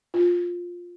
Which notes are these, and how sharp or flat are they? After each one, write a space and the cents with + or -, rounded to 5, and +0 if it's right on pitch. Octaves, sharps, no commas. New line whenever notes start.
F4 +10